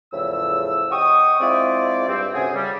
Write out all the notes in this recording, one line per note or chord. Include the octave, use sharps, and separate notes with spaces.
E2 A2 C#3 F3 E6
D#5 F#5 G5 C#6 D#6
G#3 C4 E4 F4 D5
G2 C4
D2 C3 C#4 F#4 G#4
C#3 G3